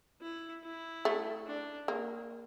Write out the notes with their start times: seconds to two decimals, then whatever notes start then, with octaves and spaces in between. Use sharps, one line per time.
0.21 E4
0.64 E4
1.05 A3
1.46 D4
1.88 A#3